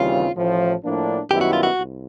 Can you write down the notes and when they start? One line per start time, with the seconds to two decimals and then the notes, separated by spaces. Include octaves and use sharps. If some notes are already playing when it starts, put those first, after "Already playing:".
Already playing: D#2 C#3 E3 G3 C4 F4
0.36 A1 A2 F3
0.84 A2 F3 A#3 D4
1.31 F#2 D#3 G3 B3 E4 G4
1.41 F#4
1.53 F4
1.63 F#4
1.78 C2